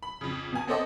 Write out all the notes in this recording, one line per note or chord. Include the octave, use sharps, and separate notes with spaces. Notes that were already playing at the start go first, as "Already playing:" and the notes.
B5
F2 C#3
B2 G#5
B3 C4 A4 C5 D5 D#5